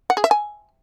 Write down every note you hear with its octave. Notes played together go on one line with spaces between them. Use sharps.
F#5
G#4
E5
G#5